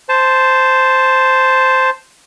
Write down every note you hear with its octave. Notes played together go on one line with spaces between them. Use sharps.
C5 A5